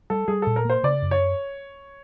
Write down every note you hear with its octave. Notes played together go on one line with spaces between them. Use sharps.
G3 A4
G3 G#4
A#2 A4
A#4
A#3 C5
C#3 D5
F#2
C#5